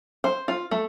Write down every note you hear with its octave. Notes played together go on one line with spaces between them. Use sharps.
C5
F4
A3